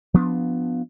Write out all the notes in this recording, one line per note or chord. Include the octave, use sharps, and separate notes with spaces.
F3 B3 D4